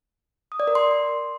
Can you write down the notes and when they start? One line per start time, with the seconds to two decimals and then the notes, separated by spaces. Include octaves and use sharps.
0.52 D#6
0.60 D5
0.67 A#4
0.75 C6